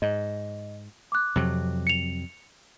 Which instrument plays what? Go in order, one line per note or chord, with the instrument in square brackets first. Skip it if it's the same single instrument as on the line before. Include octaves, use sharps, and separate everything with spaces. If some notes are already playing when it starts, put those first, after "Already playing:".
[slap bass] G#2 [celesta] D#5
[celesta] D6 F#6
[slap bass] F2 C3 F#3
[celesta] C#7 F7